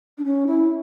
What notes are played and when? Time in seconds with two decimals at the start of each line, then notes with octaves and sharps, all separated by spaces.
0.18 D4
0.25 C#4
0.47 E4